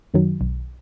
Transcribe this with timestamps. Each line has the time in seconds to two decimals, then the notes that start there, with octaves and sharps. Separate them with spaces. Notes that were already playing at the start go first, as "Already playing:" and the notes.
0.14 F#2 D#3 F#3
0.41 B1